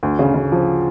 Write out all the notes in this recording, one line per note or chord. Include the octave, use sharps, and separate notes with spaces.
D2
C#3
C#3
F3